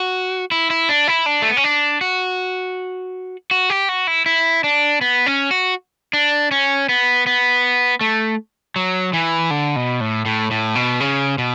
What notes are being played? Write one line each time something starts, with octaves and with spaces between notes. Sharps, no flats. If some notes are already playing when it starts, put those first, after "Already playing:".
Already playing: F#4
E4
E4
D4
E4
D4
A3
B3
C#4
D4
F#4
F#4
G4
F#4
E4
E4
D4
B3
C#4
F#4
D4
C#4
B3
B3
A3
F#3
E3
D3
B2
A2
A2
A2
B2
C#3
B2